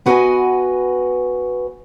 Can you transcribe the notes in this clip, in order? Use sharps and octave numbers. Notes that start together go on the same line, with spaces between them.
B3 F#4 B4 D#5 E5 G#5